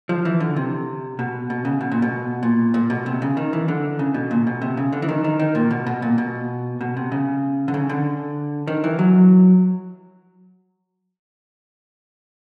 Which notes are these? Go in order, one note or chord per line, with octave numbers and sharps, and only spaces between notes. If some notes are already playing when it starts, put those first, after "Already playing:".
F3
E3
D3
C3
B2
B2
C#3
B2
A#2
B2
A#2
A#2
B2
C3
C#3
D#3
E3
D3
C#3
B2
A#2
B2
C3
C#3
D3
E3
D#3
D#3
D#3
A#2
B2
B2
A#2
B2
B2
C3
C#3
D3
C#3
D3
D#3
E3
F#3